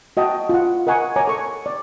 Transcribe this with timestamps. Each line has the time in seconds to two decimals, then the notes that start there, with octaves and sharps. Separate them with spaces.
0.17 F#4 D#5 G5 A5
0.49 F4 F#5
0.87 A#4 D#5 F#5 G#5 C#6
1.16 C#5 G#5 A#5 D6
1.28 A4 C#6
1.66 D5